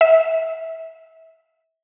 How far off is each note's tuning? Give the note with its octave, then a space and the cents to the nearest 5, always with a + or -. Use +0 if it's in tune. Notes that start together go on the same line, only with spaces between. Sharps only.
E5 -25